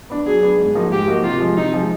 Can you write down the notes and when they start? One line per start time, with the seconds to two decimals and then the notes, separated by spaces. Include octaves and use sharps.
0.10 B3 D4
0.26 F#3 G#4
0.43 B3 D4
0.59 G#2
0.75 F3 A#3 D#4 F#4
0.91 G#2 G4
1.08 F3 A#3 D#4 F#4
1.24 C3 F4
1.40 F3 G#3
1.57 C3 D#4
1.74 F3 G#3